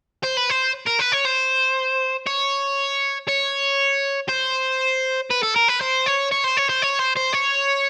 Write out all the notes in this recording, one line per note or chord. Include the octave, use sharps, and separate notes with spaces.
C5
B4
C5
A#4
B4
C#5
C5
C#5
C#5
C5
B4
A4
A#4
B4
C5
C#5
C#5
C5
C#5
C5
C#5
C5
C5
C#5